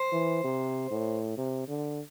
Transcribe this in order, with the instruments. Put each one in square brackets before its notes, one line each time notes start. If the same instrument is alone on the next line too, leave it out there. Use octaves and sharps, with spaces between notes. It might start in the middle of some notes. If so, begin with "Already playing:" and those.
Already playing: [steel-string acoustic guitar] C5
[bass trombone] E3
C3
A2
C3
D3